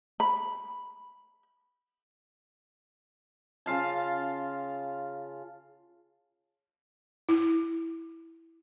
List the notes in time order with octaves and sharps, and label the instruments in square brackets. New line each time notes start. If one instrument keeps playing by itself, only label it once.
[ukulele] B5
[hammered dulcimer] C#3 F4 F5 A5
[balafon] E4